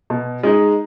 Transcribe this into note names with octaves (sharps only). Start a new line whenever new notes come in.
B2
G#3 D#4